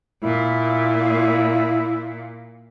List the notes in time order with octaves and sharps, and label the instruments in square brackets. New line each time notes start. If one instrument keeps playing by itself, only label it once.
[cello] A#2 [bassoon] E4